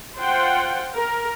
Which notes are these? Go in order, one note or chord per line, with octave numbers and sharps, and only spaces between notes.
F4 C5 F#5 G5
A#4